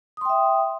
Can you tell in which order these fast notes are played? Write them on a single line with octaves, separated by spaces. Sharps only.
D#6 C6 G5 E5